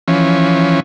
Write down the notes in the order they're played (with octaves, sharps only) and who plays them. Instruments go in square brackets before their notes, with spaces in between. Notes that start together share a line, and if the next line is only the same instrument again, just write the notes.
[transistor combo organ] E3 F3 C#4